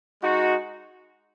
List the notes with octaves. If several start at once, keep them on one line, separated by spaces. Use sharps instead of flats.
G#3 D#4 F#4